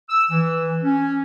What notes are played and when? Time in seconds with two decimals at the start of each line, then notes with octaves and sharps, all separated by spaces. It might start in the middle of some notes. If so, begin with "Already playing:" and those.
0.09 E6
0.30 E3
0.83 C#4